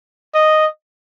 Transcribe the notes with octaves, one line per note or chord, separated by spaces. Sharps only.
D#5